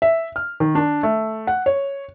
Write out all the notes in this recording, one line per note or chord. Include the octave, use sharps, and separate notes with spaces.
E5
F6
D#3
D4
A3
F#5
C#5